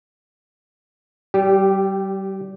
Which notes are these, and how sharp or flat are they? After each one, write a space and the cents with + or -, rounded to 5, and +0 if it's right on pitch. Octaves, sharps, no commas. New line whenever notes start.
G3 -30 G4 +0